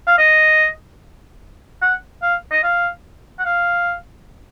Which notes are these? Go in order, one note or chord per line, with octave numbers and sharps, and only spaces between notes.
F5
D#5
F#5
F5
D#5
F5
F#5
F5